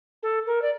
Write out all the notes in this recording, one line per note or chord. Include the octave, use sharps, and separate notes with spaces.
A4
A#4
D5